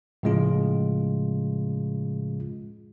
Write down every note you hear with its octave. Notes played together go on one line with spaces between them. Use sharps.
A2 C#3 F3 G#3 C#4 F4